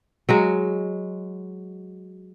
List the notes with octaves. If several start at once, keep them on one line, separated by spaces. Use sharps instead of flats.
F#3 G#3 F#4